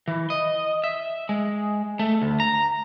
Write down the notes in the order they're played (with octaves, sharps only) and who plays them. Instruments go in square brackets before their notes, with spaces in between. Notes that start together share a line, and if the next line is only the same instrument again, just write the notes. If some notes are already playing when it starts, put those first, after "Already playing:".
[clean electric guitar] E3
D#5
E5
G#3
A3
D2
A#5